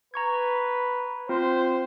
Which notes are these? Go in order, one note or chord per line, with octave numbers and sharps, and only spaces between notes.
B4 A#5 C#6 G#6
C4 F4 C5